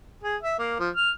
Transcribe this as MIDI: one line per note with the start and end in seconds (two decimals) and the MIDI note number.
0.23 0.36 68
0.43 0.56 76
0.58 0.75 58
0.79 0.89 53
0.95 1.10 89